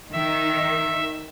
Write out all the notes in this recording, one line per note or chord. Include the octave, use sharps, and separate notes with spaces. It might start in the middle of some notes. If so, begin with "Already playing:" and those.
D#3 E5